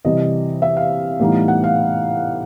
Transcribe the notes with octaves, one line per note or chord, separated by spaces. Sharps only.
C3 E3 G3 D#5
E5
F5
A2 E3 G3 B3 D#4
F#5
F5